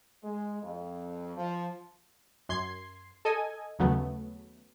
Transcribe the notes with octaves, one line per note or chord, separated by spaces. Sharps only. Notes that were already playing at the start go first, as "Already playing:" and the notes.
G#3
F2
F3
F#2 C6 G#6 C7
A4 D#5 G#5
D#2 C#3 F#3 A3 B3